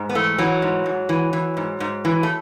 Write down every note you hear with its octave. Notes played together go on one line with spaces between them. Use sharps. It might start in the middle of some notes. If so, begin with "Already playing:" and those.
Already playing: G#2
B3
E3 A3
E3 F#3
G#2
G#2
E3
E3
G#2
G#2
E3
A3